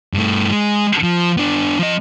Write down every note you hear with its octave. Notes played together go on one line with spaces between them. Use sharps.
G2 A3
G#3
F3
B3 D4
F3 D#5